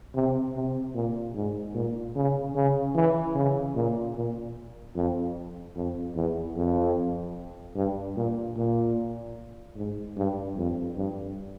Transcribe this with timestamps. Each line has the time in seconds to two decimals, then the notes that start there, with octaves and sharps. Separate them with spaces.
0.15 C3
0.55 C3
0.95 A#2
1.35 G#2
1.75 A#2
2.16 C#3
2.55 C#3
2.95 E3
3.35 C#3
3.76 A#2
4.15 A#2
4.95 F2
5.76 F2
6.15 E2
6.56 F2
7.76 G2
8.16 A#2
8.56 A#2
9.76 G#2
10.17 G2
10.57 F2
10.97 G2